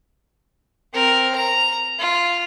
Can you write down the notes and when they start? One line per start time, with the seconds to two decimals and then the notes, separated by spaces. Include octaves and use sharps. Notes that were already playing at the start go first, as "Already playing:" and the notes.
0.94 C4 A#4
1.36 A#5
2.00 F4